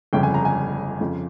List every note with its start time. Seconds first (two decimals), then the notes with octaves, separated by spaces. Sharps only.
0.13 G1 F2 C#3 G5
0.23 G#5
0.34 A#5
0.45 G#5
1.00 F2 C#3 F3